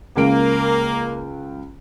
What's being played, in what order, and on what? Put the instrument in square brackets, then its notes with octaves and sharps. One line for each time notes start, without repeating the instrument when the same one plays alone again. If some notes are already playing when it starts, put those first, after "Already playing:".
[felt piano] C#2 D7 [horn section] A#3